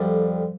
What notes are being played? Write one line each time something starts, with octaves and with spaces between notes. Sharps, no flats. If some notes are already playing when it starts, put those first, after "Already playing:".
Already playing: F2 D3 G3